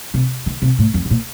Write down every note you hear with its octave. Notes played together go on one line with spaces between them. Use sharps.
C3
D3
C3
A2
F2
C3
A#2